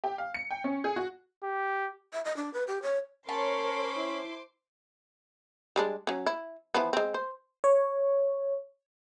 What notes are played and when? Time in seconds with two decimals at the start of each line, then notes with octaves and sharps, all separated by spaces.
0.04 G4
0.18 F5
0.34 C#7
0.51 G5
0.64 C#4
0.84 G#4
0.96 F#4
1.43 G4
2.13 E5
2.25 D#5
2.37 D4
2.54 B4
2.67 G4
2.82 C#5
3.29 C#4 A#4 C5 C#5 A5 B5 C6 D6
3.96 E4
5.76 G3 G#3 D4
6.07 F#3 C#4
6.26 E4
6.74 E3 F3 B3
6.93 G#3 C4
7.14 C5
7.64 C#5